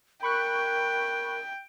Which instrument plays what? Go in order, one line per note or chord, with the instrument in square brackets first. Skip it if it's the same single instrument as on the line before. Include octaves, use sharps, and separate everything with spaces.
[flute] A#4 [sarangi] G5 [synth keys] B5 C#6 F#6